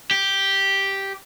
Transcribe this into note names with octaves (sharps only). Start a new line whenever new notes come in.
G4